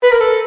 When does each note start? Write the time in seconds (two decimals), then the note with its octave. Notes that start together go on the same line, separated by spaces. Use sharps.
0.03 B4
0.12 A#4
0.20 A4